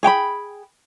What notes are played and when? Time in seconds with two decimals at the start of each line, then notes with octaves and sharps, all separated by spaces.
0.03 G#4 G5 A#5 B5